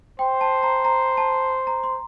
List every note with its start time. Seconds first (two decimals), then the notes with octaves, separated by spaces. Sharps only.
0.19 C5 G5
0.41 A5
0.63 A#5
0.85 A#5
1.17 A5
1.67 A#5
1.84 C6